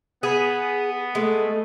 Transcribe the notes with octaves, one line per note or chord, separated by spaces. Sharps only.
B3 G#4
G#3 A3